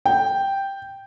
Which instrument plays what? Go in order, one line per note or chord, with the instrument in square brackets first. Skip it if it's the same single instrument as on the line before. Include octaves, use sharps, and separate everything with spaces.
[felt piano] G5